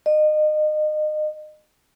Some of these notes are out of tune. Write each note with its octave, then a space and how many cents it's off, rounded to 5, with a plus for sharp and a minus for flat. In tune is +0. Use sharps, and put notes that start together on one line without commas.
D#5 -30